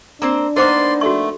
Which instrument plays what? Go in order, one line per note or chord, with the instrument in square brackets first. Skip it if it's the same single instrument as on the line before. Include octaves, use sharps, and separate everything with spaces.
[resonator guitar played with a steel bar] A#3 C4 C5 [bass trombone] D4
[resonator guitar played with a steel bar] A#3 B3 D#4 [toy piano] A#4 C5 D6 [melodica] D5 C6
[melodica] A3 [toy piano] F#4 A4 C#6